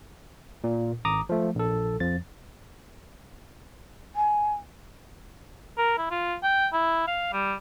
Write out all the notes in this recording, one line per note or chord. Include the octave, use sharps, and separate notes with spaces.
A#2
G#1 A#5 D6 D#6
F3 A3
A#1 A4
F2 F3 A6
G#5
A#4
E4
F4
G5
E4
F5
G3